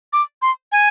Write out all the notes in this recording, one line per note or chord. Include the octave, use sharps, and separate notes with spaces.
D6
C6
G#5